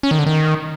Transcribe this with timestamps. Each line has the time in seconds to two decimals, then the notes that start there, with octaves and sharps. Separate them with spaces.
0.03 C#4
0.11 D#3
0.19 D3
0.26 D#3